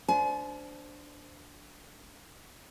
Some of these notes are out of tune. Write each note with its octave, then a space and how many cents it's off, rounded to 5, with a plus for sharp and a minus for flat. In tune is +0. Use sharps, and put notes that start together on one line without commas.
D4 -5 C5 -15 G#5 +35